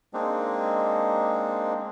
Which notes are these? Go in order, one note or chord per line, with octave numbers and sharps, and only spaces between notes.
G#3 A#3 C4 D4 D#4